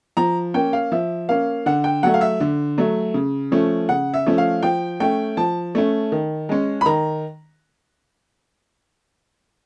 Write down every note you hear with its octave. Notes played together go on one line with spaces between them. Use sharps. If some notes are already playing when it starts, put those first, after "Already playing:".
F3 A#5
A#3 C#4 G5
F5
F3 E5
A#3 C#4 F5
D3 F#5
G5
F#3 A3 F#5
F5
E5
D3
F#3 A3
C#3
F3 A3 C#4
C#3 F#5
E5
F3 A3 C#4
F5
F3 G5
A3 C#4 G5
F3 A5
A3 C#4
D#3
G#3 C#4
B5
D#3 A#5